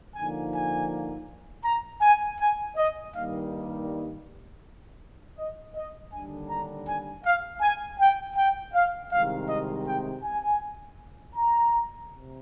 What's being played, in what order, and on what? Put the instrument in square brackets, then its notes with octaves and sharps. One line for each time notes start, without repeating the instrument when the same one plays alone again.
[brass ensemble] D3 F3 A#3 D#4 G#5
G#5
A#5
G#5
G#5
D#5
G2 D#3 G3 A#3 D#4 F5
D#5
D#5
D#2 D3 G3 D4 G#5
A#5
G#5
F5
G#5
G5
G5
F5
C2 C3 D#3 G#3 F5
D#5
G5
G#5
A#5
C3